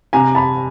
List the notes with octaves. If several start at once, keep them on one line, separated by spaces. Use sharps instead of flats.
C3 G#5 A#5
A5 B5